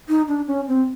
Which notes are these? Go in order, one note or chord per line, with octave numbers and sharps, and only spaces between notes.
D#4
D4
C#4
C4